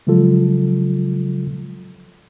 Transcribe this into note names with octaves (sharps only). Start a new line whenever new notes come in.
C#3 F3 F#3 G#3 F4 A4